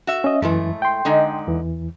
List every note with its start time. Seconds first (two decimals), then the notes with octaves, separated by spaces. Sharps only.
0.07 F#4 E5
0.24 C#4 D#5
0.42 F#2 A2 E3 G#3 A3
0.82 G5 C6
1.05 D3 G#3 D#4
1.47 E2 E3